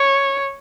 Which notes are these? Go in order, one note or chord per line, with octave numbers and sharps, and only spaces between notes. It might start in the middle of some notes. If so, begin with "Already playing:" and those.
Already playing: C#5